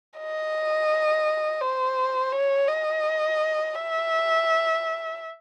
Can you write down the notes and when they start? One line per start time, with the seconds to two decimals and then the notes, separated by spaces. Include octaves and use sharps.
0.18 D#5
1.61 C5
2.32 C#5
2.68 D#5
3.75 E5